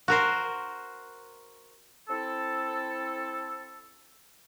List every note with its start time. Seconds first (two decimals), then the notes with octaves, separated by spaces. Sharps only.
0.08 F#4 A#4 C5
2.09 C4 E4 A4